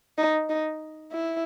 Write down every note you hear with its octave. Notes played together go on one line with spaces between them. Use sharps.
D#4
D#4
E4